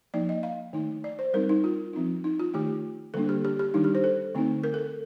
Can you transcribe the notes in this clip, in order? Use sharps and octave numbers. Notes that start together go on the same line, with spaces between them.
F3 A#3 D#4 D5
D#5
F5
D#3 A3 D#4
D5
C5
G3 C4 D#4 A#4
D#4
F4
F3 C4 D#4
D#4
F4
D#3 A3 D#4 G4
D3 G3 A#3 D4 A4
G4
G4
G4
D#3 G3 D4 D#4
G4
C5
A4
D3 A3 C4 D#4
A#4
A4